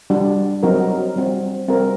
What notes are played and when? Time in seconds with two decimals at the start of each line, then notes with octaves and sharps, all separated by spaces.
0.10 G3 D4 F#4
0.63 F#3 C4 D#4 F#4 A#4
1.16 G3 C4 F#4
1.68 G3 C4 F#4 A#4